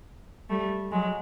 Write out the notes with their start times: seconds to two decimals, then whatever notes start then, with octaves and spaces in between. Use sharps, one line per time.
0.49 G3 A3
0.91 F#3 G#3